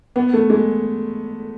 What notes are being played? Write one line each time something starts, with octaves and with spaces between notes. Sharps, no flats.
B3
A3
G#3